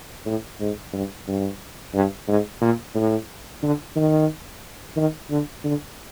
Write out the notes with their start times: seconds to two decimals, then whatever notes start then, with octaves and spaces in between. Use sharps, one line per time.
0.26 A2
0.60 G#2
0.93 G2
1.28 G2
1.94 G2
2.28 G#2
2.61 A#2
2.95 A2
3.63 D3
3.96 D#3
4.97 D#3
5.30 D3
5.64 D3